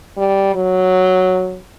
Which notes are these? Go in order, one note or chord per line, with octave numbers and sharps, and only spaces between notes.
G3
F#3